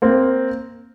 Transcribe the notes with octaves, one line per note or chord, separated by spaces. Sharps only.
A#3 C4